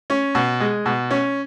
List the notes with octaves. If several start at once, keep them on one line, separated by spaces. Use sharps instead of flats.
C#4
B2
G#3
B2
C#4